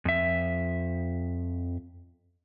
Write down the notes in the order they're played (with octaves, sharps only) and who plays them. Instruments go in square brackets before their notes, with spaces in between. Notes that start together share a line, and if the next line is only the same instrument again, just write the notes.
[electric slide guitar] F2 E5